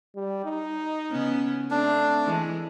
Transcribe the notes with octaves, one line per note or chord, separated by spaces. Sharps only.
G3
D#4
C#3 B3 C#4
A3 C4 D4
E3 G#3